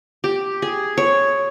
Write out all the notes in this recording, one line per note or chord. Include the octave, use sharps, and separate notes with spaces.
G4
G#4
C#5